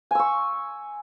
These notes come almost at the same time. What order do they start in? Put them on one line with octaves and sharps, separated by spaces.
G#5 E6 C#6